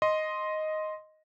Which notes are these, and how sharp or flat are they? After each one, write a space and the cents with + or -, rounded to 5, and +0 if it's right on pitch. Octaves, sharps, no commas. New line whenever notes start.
D#5 +0 C6 +0